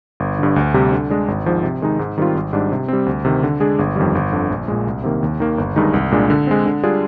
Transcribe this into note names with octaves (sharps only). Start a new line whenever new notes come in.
G1
G2 D3
D2
C3 G3 C4
D3
G#3 D4
G#1
G#2 F3
C3
D#3 G#3 D#4
G#2
D#3 G3 C4 F4
G#1
G#2 G3 D4
C3
G3 C4
D2
C3 D#3
D3
G#3 D4 G#4
G1
F2 D#3 G3
G1
F2 D3
A#1
A#2 G#3
C2
C3 D#3 A#3
D#2
D#3 A#3
G1
G2 D#3 G#3 D#4
C2
A#2 G#3 D4
D3
G#3 C4
D3
G3 D4 F4 G#4